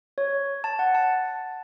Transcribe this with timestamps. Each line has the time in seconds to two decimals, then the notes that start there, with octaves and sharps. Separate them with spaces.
0.18 C#5
0.64 A5
0.79 F#5
0.95 A5